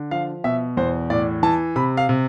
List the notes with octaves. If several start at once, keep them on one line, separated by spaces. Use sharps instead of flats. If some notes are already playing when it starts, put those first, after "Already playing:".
Already playing: D3
F3 F5
B2 E5
E2 C5
A2 D5
E3 A5
C3 B5
F5
C3